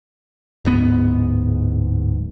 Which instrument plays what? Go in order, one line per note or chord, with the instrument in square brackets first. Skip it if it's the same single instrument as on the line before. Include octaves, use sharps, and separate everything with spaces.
[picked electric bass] D1 G#2 B3